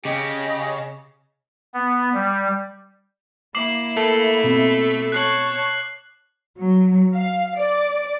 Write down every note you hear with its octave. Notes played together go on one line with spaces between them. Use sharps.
C#3 G4 D#5
B3
G3
A#3 E4 D6 C7 F#7
A3 A#4 A5
B2 C4
C#5 A5 C#6 F#6 C7 F#7
F#3
F5
D5